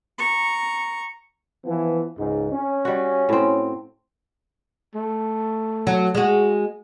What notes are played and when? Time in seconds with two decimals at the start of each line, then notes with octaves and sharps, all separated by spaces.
0.18 A#5 C#6
1.65 E3 F3 B3
2.18 C#2 G#2
2.52 C#4
2.85 G3 F#4
3.29 A2 C4
4.94 A3
5.87 F#3
6.15 G#3 F#4